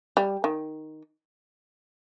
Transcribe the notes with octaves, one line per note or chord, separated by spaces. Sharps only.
G3
D#3